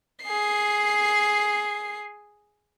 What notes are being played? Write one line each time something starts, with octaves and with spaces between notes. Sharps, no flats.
G#4 C7